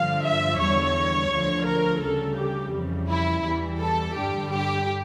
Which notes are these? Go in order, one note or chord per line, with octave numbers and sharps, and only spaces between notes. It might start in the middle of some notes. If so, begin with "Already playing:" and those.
Already playing: G2 D3 F3 F5
E5
E2 D3 G3 C#5
D2 D3 F3
A#4
D2 C#3 G3 A4
G4
F2 C#3 E3 G3
E4
E2 E3 G3
A4
G2 D3 G3 G4
G4